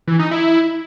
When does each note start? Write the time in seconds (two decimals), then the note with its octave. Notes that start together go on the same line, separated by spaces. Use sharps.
0.08 E3
0.19 D#4
0.31 E4